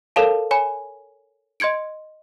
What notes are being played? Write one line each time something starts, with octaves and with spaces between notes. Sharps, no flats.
A4 A#4 C#5 F5 A5
C#5 G#5 B5
D#5 C6 G#6 C#7 D7